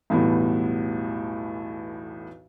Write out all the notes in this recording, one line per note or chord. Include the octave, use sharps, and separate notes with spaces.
B1 E2 A2 E3 G3 B3